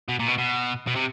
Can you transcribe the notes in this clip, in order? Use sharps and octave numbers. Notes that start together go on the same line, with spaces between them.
B2
A#2
B2
B2
B2
C3